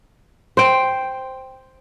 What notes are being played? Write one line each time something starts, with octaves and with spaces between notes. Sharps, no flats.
C5 G5